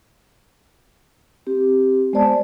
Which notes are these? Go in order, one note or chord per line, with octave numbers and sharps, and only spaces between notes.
C4 G4
G#3 B3 C5 D5 A5